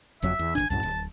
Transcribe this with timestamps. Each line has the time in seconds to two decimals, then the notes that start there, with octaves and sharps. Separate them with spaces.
0.22 F#1 F2 F#3 E5
0.39 E2
0.55 G#1 F#2 D4 G#5
0.70 C2 F#2 A2 A5
0.83 D1